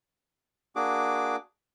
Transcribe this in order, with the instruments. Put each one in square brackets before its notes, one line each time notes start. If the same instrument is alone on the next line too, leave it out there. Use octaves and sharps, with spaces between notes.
[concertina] A#3 D4 F#4 G#4 D6